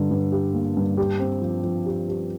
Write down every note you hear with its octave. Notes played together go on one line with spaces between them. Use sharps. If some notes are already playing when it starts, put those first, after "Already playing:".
Already playing: G2 D3
G2
G4
A#3
G2
G4
C4
F3
F3
G4
G4